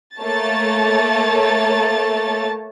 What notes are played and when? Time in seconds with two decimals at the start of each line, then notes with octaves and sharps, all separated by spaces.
0.17 A3 A#3 C#5 A5 A6